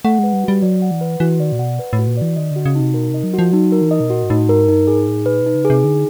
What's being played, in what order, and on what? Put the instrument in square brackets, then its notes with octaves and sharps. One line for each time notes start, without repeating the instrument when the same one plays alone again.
[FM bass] A3 [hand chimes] F#5
[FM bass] G#3 [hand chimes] B4
[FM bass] G3
[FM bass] G3 [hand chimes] F#4
[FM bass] F#3 [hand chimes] D5
[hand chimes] F#5
[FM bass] E3
[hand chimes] B4
[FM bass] E3 [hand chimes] F#4
[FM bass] D#3 [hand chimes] D5
[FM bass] A#2
[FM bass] B2 [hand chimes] F#5
[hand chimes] B4
[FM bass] A2
[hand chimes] F#4
[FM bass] A#2
[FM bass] E3 [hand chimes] D5
[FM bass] D#3 [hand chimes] D#5
[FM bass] D3 [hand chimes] F#4
[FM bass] C#3
[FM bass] C3 [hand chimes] D#4
[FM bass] B2 [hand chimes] A#4
[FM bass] C3 [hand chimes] D#5
[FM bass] F#3
[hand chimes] F#4
[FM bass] F3
[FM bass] F#3 [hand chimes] D#4
[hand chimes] A#4
[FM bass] E3
[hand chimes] D#5
[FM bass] B2
[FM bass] A#2 [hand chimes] F#4
[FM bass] G#2
[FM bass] A2 [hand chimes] D#4
[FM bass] G#2 [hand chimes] A#4
[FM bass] G2 [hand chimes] D#4
[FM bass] G#2 [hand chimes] G#4
[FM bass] A2 [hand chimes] D#4
[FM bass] A#2 [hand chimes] B4
[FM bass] B2 [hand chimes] D#4
[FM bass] C#3
[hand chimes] G#4
[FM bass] C3
[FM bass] D3 [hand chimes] D#4